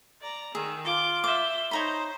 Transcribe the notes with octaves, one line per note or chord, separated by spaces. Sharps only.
D5 A#5
D#3 G#4 E6
F4 D6 G7
C5 E5 D6
D#4 C5 C#5 A#5 B5